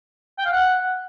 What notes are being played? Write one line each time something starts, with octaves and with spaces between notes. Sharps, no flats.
G5
F5
F#5